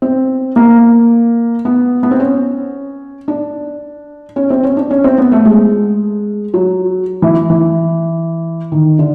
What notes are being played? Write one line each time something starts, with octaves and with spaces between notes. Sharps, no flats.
C4
A#3
B3
B3
C4
C#4
D4
C#4
C4
C#4
D4
C#4
C4
B3
A3
G#3
F#3
E3
E3
D#3
D3